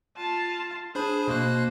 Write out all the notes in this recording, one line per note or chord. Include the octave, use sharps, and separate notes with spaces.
F4 A5
D4 G#4 C5 B5
B2 A#3 C5 F#6